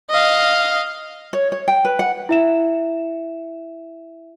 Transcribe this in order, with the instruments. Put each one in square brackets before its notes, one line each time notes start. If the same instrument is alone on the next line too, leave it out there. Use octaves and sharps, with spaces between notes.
[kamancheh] D#5 F5
[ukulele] C#5
C#5
G5
B4
F#5
[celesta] E4 E5 E7